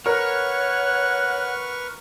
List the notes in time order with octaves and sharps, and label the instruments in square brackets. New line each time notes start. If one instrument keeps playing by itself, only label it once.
[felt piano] A#4 [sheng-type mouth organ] B4 C#6 F6 [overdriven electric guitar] C#5 [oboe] F#5